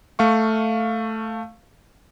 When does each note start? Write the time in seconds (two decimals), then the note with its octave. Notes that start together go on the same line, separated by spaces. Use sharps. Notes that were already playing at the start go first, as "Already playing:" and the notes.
0.19 A3 F5 C#6